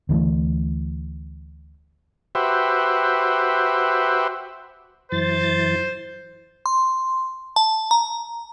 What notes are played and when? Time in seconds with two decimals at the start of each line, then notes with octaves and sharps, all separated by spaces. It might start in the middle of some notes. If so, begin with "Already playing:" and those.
0.09 D2 E3 F#3 A3
2.35 F#4 G4 B4 C5 E5
5.12 F#2 E3 C5 A6
6.66 C6
7.56 A5
7.91 A#5